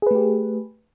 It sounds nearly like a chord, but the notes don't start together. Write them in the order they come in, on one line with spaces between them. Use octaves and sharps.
G#4 B4 A3 G4